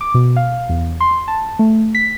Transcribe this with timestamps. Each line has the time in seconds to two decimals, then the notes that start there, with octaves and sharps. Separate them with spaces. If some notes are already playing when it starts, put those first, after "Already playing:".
0.01 D6
0.14 B2
0.36 F5
0.69 E2
1.00 C6
1.28 A5
1.59 A3
1.95 B6